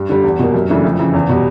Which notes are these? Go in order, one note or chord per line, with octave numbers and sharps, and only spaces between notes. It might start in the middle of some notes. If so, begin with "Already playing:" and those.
Already playing: G2
D3 G3
E2
B2 G3 A#3
F#2
C#3 E3 A3 D4
F2
C#3 E3
E2
B2 G3